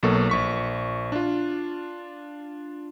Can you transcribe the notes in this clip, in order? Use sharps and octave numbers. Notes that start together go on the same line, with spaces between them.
B1 B2 F#3 A#3 A4 C#6
A#1 C#6 B6
D4 F4